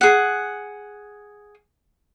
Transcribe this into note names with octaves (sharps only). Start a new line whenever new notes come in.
G#4 F#5